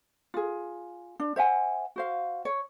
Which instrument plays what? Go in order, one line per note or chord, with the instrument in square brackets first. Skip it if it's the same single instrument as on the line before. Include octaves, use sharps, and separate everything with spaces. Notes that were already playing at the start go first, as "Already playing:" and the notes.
[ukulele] F4 G#4
D4
C5 E5 F#5 G#5
F#4 C5 F5
C#5